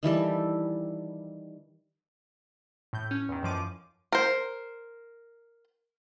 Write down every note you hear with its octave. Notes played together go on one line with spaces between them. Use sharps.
D#3 E3 G3 A4
A2 G6
C#4
E2 D#3
F#2 F3 D6 D#7
A#4 C5